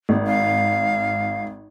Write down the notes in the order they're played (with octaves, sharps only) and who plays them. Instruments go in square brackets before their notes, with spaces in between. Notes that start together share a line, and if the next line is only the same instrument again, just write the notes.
[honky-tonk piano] G#1
[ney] F5